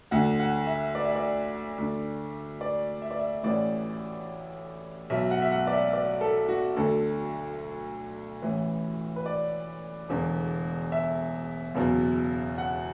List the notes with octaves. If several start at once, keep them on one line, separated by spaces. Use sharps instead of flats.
D2 D3 F#5
F#5
E5
D5
E5
D5
D2 D3
D5
E5
D5
E5
A1 A2 E3 D5
B1 B2 E5
F#5
E5
F#5
D5
E5
D5
A4
F#4
D2 D3 A4
A1 A2 E3
B4
D5
E1 E2 D3
E5
F#1 E2 B2
F#5